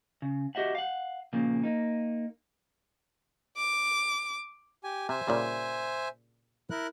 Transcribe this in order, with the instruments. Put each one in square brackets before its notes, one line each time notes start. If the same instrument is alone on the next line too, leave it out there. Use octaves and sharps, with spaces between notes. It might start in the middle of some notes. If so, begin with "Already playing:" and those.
[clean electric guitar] C#3
F#4 G4 D#5 E5 F#5
F5 F#5
A#2 C#3 F3 A#3
A#3 D#4
[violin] D6
[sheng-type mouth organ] G4 G#5
[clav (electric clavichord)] C3 [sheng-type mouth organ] C5 E5 G#5
[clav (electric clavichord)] A#2 C#3 G3
[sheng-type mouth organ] E4 A#4 F#6